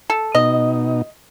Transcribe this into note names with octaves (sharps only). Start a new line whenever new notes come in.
A4
B2 D#4 D#5